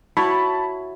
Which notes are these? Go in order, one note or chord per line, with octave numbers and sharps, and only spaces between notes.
E4 F#4 C#5 A5 B5